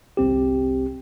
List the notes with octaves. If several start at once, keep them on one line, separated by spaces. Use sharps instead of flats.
G1 C2 C4 G4